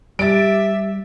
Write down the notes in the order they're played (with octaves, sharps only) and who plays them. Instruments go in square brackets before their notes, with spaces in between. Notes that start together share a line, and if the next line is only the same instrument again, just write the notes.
[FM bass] G3 [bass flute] G4 [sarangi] E5 [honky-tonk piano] A6 D7